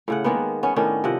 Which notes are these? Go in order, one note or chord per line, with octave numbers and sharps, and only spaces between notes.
A2 C#3 F#5
D#3 G#3 A#3 B3
B3 C#4
A2 D#3 C#4 D4
C3 F3 D#5 F#5